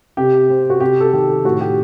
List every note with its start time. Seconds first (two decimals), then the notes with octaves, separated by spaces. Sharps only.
0.17 C3 G4
0.50 C4
0.70 F#4
0.80 C3 G4
1.00 A4
1.13 D#3 G4
1.44 A2 F#4
1.61 G4